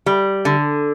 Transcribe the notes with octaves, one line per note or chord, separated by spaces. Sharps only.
G3
D3